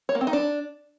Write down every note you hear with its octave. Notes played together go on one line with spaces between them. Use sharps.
C#5
A#3
C4
D#4
D4